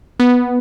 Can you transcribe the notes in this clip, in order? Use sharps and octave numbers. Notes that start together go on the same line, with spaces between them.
B3